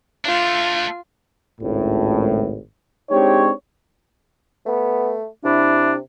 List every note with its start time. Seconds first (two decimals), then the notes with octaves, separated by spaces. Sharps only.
0.25 A3 D4 F4
1.61 G#1 C#2 A2
3.11 G#3 C4 D4 D#4 G4 C#5
4.66 A3 B3
5.45 C3 D4 E4